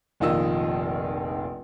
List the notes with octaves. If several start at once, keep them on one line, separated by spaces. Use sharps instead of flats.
F1 A#1 D#3 F4 D#5 E6